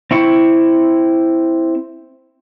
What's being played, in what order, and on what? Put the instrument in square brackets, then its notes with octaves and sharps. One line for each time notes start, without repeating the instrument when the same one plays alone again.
[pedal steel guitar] C4 E4 C#6